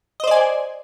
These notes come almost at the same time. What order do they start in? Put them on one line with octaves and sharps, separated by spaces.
D#5 C5 D5 G#5